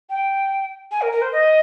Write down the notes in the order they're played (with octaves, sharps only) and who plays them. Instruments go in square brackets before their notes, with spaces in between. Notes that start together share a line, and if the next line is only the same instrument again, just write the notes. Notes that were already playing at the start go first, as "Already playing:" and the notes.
[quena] G5
G#5
A#4
A#4
C5
D#5